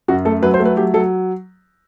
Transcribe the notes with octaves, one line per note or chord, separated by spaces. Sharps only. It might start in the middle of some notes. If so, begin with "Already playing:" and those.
F#2 F#4
A3 A4
F#3 B4
C5
A3
B4
F#3 G4
F#3 A4